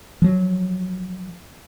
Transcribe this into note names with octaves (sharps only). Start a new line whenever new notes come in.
F3 F#3